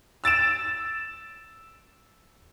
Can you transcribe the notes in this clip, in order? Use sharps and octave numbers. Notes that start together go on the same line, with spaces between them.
E6 A6 D7 E7